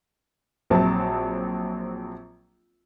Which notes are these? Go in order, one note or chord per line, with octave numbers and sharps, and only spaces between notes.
A#1 F#3 C4 A5